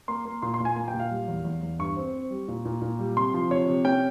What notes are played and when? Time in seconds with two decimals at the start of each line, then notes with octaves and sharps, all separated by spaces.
0.08 A#3 C6
0.25 A#3
0.42 A#2 C6
0.54 C6
0.60 A#2 G#5
0.76 A#3 G#5
0.88 G5
0.94 A#2
0.99 F5
1.10 G3
1.28 E2
1.45 E2
1.63 E2
1.79 G2 C#6
1.97 C4
2.13 C4
2.31 G3
2.48 A#2
2.65 A#2
2.82 A#2
2.99 G3
3.17 C3 C6
3.34 F3
3.50 C3 C#5
3.68 C3
3.85 C#4 G5